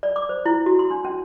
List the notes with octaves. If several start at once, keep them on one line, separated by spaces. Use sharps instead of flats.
D5
D6
C5
E4
F#4
C6
D4
C#4